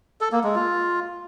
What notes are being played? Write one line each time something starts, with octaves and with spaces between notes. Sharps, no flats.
A4
A#3
G#3
F4